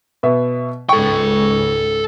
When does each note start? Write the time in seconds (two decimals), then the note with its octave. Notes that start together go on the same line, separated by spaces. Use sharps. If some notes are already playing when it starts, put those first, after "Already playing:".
0.23 B2 B3 E5
0.89 C#2 G#2 A4 G5 C#6